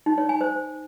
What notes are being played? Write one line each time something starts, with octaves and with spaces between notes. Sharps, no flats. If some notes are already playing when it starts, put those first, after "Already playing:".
D#4
C#5
G#5
C5